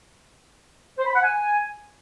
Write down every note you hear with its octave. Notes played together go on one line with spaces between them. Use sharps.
C5
B5
F#5
G#5